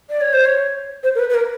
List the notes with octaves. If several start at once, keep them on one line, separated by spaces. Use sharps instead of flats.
D5
C#5
C5
C#5
C5
A#4
B4
B4
A#4